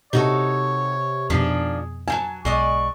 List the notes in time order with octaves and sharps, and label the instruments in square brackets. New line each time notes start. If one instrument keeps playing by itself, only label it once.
[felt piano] C3 [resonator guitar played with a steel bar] D#4 F#4 A4 [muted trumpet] C#5
[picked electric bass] F2 B2 [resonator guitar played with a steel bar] D#3 F3 D4 [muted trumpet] G#4
[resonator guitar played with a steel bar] F#3 C4 A5 [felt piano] G#5
[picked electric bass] B1 [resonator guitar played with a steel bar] G#3 D5 D#5 [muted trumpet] C#6